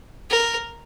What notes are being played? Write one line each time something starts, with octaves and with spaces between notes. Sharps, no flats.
A#4